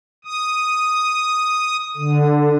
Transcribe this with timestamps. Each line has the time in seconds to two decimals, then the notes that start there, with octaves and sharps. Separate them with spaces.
0.25 D#6
1.96 D3